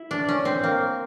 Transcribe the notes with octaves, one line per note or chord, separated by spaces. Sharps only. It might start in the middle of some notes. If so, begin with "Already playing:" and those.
Already playing: E4
D4
C#4
C4
A#3